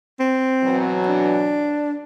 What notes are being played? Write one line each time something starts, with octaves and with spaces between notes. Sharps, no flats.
C4
B2 E3 F#3
D4